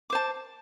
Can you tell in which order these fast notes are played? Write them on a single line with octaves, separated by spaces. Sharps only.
D6 C5 A5